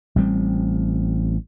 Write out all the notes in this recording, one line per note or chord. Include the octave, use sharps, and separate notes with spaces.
A1 G3 C4